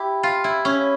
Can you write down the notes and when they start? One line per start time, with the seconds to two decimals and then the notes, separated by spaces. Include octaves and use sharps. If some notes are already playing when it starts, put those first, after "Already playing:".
Already playing: E4 G4
0.23 F4
0.44 E4
0.65 C#4